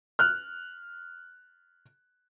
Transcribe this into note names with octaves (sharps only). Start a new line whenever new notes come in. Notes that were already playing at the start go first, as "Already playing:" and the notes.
F6 F#6